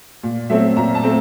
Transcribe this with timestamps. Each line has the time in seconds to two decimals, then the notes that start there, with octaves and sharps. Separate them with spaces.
0.23 A#2
0.50 F#3 A3 C4 E5
0.77 A#2 A#5
0.95 A5
1.03 A3 C4